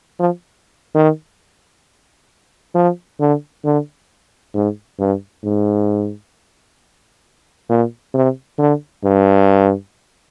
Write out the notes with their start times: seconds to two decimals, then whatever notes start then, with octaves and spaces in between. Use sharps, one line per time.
0.20 F3
0.95 D#3
2.75 F3
3.20 D3
3.64 D3
4.54 G#2
5.00 G2
5.44 G#2
7.70 A#2
8.14 C3
8.59 D3
9.04 G2